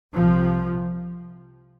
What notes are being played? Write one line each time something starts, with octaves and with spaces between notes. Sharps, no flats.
C2 C3 F3